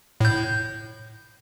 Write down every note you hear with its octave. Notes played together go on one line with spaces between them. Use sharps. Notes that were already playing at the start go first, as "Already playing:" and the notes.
A2 G6